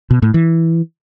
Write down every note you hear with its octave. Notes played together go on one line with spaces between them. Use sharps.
B2
A2
E3